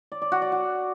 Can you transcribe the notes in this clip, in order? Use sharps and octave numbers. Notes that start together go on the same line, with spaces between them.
D5
D5
F#4
D5
F#4